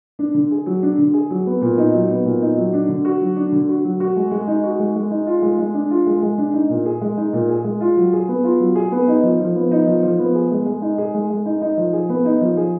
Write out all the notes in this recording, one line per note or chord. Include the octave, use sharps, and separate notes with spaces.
D4
D3
G#4
F#3
D4
D3
G#4
F#3
B3
A#2
D#4
F#3
B3
A#2
D#4
F#3
D4
D3
F#4
F#3
D4
D3
F#4
F#3
F#4
G#3
G#3
D#4
F#4
G#3
G#3
D#4
F4
G#3
G#3
D4
F4
G#3
G#3
D4
D#4
A#2
G#4
G#3
D#4
A#2
G#4
G#3
F4
F#3
G#4
B3
F4
F#3
G#4
B3
D#4
F3
F3
B3
D#4
F3
F3
B3
G#4
G#3
G#3
D#4
G#4
G#3
G#3
D#4
D#4
F3
G#4
B3
D#4
F3
G#4